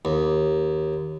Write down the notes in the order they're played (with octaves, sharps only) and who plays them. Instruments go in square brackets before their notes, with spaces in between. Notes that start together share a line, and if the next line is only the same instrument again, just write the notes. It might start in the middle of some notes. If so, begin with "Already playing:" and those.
[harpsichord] D#2